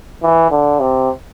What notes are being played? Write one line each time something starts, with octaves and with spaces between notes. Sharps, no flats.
E3
D3
C3